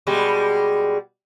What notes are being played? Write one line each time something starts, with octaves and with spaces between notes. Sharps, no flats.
B2 G3 G#3